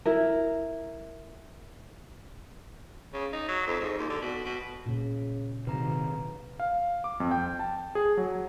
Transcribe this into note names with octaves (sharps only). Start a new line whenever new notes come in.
E4 A#4
C#3
D#4
F#3
F2
G#2
D#2
D3
B2
B2
A#2 C#3
C3 D#3 F#3 B4 A#5
F5
D6
F2
G5
A5
G#4
F#3